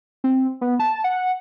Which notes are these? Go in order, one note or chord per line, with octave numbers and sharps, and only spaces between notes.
C4
B3
A5
F#5